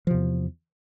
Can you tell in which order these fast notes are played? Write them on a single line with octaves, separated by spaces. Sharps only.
F3 C3 E2